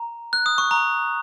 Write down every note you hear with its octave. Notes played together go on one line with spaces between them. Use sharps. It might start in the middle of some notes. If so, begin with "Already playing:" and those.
Already playing: A#5
F#6
D#6
C#6
A#5